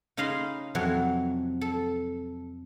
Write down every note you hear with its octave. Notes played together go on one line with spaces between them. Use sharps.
C#3 D#4 D#5 F5 B5 C6
F2 C3 F#3
A4